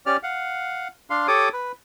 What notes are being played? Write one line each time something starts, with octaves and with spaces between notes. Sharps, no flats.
C#4 G4 D5 F6
F5 F#5
D4 F5 C6
G4 A4 C#5 D6 D#6
B4